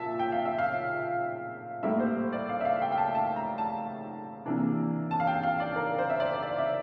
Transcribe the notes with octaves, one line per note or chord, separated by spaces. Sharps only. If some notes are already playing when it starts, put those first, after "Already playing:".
Already playing: A#2 E5 A5
G5
F5
E5
F5
A2 G3 A#3 E5
C5
D5
F5
E5
F5
G5
G5
A5
A5
A#5
A5
C3 E3 A#3 D4
A5
F5
G5
F5
D5
A#4
C5
E5
D5
D5
E5